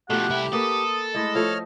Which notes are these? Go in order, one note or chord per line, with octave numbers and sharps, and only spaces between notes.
B2 F3 A3 G4 F#5
C2 E4
A#3 A4 B4 D#6
G#3 A3 E4 D#5
F3 A3 C#5 F6